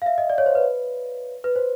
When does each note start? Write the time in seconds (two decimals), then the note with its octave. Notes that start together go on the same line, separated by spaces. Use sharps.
0.02 F5
0.06 E5
0.18 D#5
0.30 D5
0.38 C#5
0.46 C5
0.55 B4
1.44 B4
1.56 C5